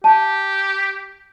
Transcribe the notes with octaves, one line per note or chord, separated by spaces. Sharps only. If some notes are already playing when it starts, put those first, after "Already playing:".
G4 A5